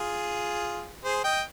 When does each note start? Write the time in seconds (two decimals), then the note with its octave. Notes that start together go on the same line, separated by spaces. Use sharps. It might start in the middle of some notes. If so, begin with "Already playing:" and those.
Already playing: F4 G#4
1.04 G#4 C5
1.24 D#5 G5